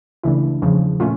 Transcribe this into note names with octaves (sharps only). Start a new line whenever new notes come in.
C#2 C#3 E3 A3 D4 E4
E2 C#3 F3
A#2 A3 C#4 F4